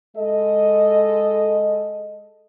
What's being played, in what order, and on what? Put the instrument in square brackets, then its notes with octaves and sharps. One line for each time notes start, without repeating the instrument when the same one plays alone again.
[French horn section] G#3 A4 D#5